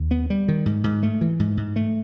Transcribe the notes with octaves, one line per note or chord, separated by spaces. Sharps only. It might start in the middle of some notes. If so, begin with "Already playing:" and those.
Already playing: D#2
B3
G3
D#3
G#2
G#2
A3
E3
G#2
G#2
A3